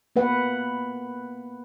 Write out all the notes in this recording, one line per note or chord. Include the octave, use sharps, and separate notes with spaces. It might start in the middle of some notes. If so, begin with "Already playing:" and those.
A#3 B3 B4 F#5